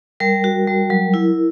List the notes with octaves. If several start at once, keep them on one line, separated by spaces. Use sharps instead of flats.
G3 A#4
F#4
G3
F#3
E4